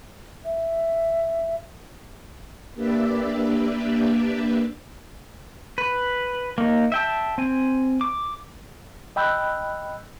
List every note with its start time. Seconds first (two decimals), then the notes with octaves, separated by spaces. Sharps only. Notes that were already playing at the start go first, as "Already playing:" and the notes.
0.45 E5
2.74 A#3 D4 G4 B4 D5 E5
5.78 B4
6.58 A#3 D#4
6.92 E5 G5 A5
7.38 C4 G#5
8.01 D6
9.16 D#5 G5 B5 E6 F#6 G6